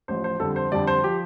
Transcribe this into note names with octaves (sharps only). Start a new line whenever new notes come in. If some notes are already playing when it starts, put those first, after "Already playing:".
A1 A2 F3 C5
C5
F2 D3 G3 A4
C5
F2 D3 G3 D5
C5
F3 G4